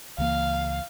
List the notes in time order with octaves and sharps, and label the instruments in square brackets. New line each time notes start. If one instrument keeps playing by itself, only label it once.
[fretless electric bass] C#2 E3 A#3 [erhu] F5